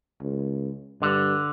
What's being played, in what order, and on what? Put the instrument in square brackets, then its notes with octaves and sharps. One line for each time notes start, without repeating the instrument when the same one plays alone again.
[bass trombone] C#2
[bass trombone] G2 [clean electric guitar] D3